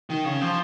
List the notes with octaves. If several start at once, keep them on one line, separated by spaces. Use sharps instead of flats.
D#3
C#3
F3